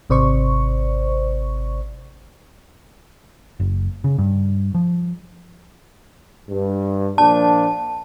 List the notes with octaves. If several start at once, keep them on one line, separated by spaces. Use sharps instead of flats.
G#1 C3 C5 D5 C#6
F#1
C#3
G2
F3
G2
A#2 F3 D4 A5